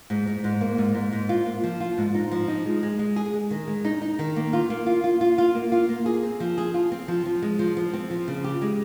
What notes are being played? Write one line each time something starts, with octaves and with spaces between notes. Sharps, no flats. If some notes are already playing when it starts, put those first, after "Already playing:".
G#2
G#2
G#2
A#3
G#2
G#2
G#2
F4
A#3
F3
F4
G#2
D#4
F3
D#4
G#3
G#3
G#3
G#4
G#3
D#3
G#3
D#4
D#4
D#3
A#3
F4
A#3
F4
F4
F4
F4
A#3
F4
A#3
G#4
C4
F3
G#4
F4
C4
F3
F3
G#3
F3
F3
C4
F3
C#3
G4
G#3